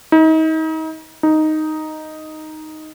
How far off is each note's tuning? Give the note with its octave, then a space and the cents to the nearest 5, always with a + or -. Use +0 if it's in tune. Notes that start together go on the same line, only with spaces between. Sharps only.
D#4 +35
D#4 +0